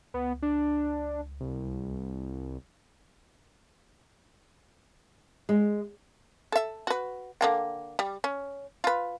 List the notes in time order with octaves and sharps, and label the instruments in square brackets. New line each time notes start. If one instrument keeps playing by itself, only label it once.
[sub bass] C#2 [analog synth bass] B3
[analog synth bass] D4
C2
[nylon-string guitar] G#3
[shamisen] A4 E5
F#4 B4
D3 A#3 G5
G3
C#4
F4 B4